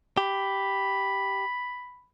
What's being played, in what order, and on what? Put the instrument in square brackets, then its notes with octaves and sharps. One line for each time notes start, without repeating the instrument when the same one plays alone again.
[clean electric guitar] G4 [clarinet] B5